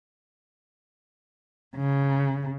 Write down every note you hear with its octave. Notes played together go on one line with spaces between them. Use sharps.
C#3